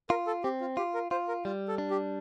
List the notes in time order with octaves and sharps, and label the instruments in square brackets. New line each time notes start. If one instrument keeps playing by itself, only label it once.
[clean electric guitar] F4 [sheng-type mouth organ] A#4
[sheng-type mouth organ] A4
[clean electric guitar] C4 [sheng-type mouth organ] G4
[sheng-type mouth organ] F4
[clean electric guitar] F4 [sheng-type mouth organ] G4
[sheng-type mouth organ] A#4
[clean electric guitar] F4 [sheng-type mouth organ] C5
[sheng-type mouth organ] A#4
[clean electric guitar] G3 [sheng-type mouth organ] F4
[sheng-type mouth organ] A4
[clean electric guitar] D4
[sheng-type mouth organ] G4